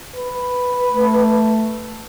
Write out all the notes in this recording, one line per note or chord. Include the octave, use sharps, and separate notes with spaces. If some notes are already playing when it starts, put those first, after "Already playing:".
B4
A3